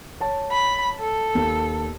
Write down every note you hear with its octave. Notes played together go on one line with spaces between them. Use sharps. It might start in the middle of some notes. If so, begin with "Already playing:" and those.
C#5 A5
B5
A4
D#2